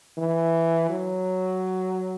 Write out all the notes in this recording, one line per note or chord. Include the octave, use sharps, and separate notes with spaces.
E3
F#3